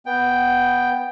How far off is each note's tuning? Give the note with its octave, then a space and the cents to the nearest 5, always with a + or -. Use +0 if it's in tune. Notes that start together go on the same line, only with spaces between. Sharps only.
B3 +0 G5 +0